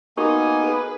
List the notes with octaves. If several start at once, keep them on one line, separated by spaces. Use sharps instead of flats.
A#3 B3 D#4 F#4 A#4 G#5 C#6
G#4 A4 B4